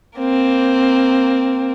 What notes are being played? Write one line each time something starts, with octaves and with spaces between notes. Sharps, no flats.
A#3 C4